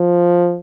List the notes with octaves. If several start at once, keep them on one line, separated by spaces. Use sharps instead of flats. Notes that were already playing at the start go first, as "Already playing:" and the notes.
Already playing: F3